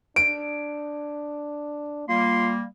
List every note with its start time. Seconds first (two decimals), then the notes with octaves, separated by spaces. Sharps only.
0.16 D4 D7
2.09 G3 A#3 F4 C6